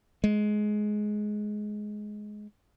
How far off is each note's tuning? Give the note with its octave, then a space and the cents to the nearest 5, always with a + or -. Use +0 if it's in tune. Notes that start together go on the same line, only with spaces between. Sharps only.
G#3 +15